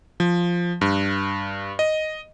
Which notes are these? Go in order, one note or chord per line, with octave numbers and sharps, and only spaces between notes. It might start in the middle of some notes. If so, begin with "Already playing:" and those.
F3
G2
D#5